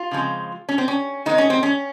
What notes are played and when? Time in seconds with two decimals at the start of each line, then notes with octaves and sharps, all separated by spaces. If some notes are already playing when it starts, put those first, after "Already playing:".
Already playing: F4
0.11 C#3 F3 G#3 C4
0.69 C#4
0.78 C4
0.88 C#4
1.26 D#3 G#3 C4 D#4
1.38 C#4
1.50 C4
1.63 C#4